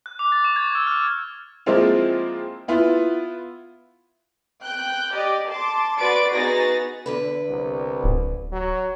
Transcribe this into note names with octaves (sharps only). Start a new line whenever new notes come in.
F#6
D6
A6
C#6
G#6
E6
F6
F3 G#3 A#3 C4 E4 F4
B3 E4 F4
G5 F#6 G6
G4 D5 D#5
A5 C6 D6
F#4 B4 D5 C6 A6 D7
B3 D#4 F#4 G#4 A6 A#6
E2 D3 B4
C2
D1
F#3